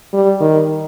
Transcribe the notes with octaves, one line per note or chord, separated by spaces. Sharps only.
G3
D#3